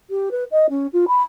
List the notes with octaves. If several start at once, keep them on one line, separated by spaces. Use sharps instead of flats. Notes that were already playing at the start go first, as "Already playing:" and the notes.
G4
B4
D#5
C#4
F4
B5